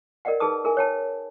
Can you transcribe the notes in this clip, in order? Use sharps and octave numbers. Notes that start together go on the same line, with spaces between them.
A#4 D5 D#5 F#5 G5
D#4 G#4 B4 A5 D#6
G#4 A#4 E5 G#5
C#5 G5 A5